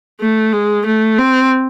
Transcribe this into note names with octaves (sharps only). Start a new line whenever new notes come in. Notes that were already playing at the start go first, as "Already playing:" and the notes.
A3
G#3
A3
C4